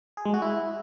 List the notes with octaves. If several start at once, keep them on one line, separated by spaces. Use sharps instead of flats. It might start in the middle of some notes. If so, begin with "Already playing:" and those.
G#4
G#3
F#4
E4